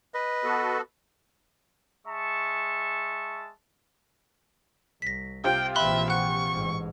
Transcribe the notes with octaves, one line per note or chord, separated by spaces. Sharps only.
B4 D#5
B3 F#4 A4
G#3 E5 A5 C#6
C2 A#6 B6
C3 C4 F4 G5
A#1 E3 E5 B5 C6 F#6
F#5 C#6 F#6
A1 G#2